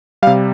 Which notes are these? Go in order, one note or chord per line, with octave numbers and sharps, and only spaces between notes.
C3 G3 F5